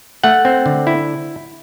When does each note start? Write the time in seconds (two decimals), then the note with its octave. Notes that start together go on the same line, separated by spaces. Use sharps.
0.24 A3 F#5
0.45 C4
0.66 D3
0.87 E4